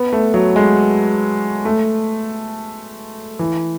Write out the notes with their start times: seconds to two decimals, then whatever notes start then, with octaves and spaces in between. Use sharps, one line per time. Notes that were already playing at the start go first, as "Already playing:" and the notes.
Already playing: B3
0.13 A3
0.34 F#3
0.56 G#3
1.65 A3
3.39 E3